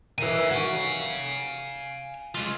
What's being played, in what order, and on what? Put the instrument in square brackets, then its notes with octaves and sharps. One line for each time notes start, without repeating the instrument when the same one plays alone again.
[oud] D#3 E3 [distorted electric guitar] F5 G#5
[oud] F#4
[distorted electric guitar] G#3 F4